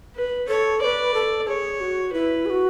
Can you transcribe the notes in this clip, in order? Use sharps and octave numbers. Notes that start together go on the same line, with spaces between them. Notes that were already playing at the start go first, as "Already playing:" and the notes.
B4
A4 C#5
B4 C#5 D5
A4
G#4 C#5
F#4
E4 B4
G#4
F#4